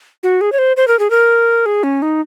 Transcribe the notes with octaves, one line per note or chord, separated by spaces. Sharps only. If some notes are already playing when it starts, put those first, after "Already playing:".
F#4
G#4
C#5
C5
C5
A#4
G#4
A#4
G#4
C#4
D#4